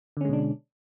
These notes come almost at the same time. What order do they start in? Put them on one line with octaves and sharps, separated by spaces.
D3 C#4 G#3 B2 D4